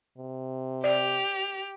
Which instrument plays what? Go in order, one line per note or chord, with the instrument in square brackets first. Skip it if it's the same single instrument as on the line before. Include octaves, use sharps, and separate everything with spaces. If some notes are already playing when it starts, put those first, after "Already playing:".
[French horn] C3
[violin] G4 F7 [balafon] D5